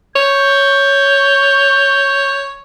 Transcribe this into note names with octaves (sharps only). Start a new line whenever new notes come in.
C#5 G6